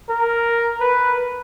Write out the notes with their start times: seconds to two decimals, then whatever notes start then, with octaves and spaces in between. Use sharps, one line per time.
0.09 A#4
0.80 B4